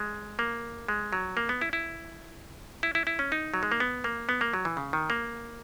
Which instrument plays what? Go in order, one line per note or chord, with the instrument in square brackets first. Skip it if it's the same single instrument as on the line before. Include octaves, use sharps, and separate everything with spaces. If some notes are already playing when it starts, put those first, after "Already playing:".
Already playing: [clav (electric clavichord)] G#3
A#3
G#3
F#3
A#3
B3
E4
E4
E4
E4
E4
C#4
D#4
F#3
G#3
A#3
B3
A#3
B3
A#3
F#3
E3
C#3
D#3
A#3